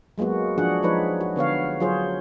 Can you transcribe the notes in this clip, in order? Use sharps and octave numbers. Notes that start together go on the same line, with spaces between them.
F#3 G#3 A#3 B3 F#4
F3 D4 F#4 G#4 F#5
F3 G#3 D#4 B4 C#5
F#4
D3 B3 C#5 F5
F#3 F4 G#4 C5 C#5